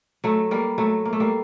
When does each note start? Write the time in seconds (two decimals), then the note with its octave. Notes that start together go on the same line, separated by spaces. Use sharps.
0.24 F#3 A3
0.51 G3 A#3
0.78 F#3 A3
1.05 A#3
1.13 A3
1.20 G3 A#3